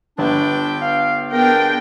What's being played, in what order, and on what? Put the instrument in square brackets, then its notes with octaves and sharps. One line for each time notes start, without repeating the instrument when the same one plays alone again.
[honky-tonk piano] G1 [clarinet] D4 [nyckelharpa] B4 G5
[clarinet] F5
[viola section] B3 G5 [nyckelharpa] D4 G#4 [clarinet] A#4